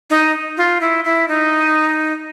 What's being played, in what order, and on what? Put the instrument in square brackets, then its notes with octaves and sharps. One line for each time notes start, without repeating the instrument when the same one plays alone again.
[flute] D#4
F4
E4
E4
D#4